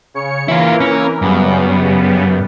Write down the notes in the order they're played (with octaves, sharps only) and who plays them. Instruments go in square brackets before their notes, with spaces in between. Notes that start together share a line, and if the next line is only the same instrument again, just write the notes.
[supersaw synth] C#3 C#5 C#7
[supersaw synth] E3 A#3 A#4 [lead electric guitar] E4 F4
[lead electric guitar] C#4
[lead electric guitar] F#2 [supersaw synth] C#3 G3 B3